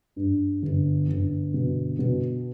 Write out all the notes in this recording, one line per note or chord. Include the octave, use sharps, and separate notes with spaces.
G2
G1
G1
B2
B2